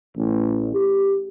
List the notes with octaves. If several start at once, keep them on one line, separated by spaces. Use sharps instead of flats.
A1
G4